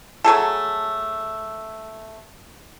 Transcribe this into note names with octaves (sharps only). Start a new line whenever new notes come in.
F#3 A3 G#4 A4